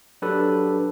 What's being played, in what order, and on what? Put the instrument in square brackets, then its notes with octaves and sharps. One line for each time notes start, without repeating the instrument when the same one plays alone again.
[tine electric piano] F#3 D4 G4 A4 B4